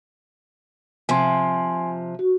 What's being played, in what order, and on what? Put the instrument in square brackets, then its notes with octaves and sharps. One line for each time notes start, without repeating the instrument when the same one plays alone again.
[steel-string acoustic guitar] C3 F3 [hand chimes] G#5 C6
[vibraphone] F#4